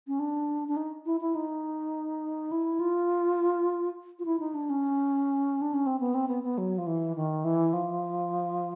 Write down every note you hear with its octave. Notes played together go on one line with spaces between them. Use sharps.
C#4
D4
D4
D#4
E4
E4
D#4
E4
F4
F4
E4
D#4
D4
C#4
D4
C#4
C4
B3
C4
B3
B3
F#3
F3
E3
D#3
E3
F3